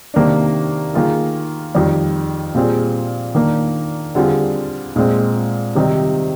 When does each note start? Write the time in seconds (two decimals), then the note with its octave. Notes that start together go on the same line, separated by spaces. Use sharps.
0.14 C3 D#3 A#3 D4
0.94 D#3 A#3 F4 G#4
1.75 F2 D#3 G3
2.55 A#2 G3 C4 F4 G#4
3.35 D#3 A#3 D4
4.15 D3 G3 C4 F4 G#4
4.96 A#2 G#3 C4
5.75 C3 D#3 G3 C4 D#4